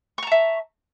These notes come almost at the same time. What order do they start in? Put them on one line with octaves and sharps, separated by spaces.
C#6 A#5 A5 E5